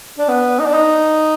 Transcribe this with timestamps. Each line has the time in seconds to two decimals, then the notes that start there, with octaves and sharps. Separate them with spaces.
0.19 D4
0.28 B3
0.59 D#4
0.66 D4
0.73 D#4